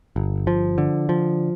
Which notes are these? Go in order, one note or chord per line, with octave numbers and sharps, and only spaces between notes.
G1
F3
D3
F3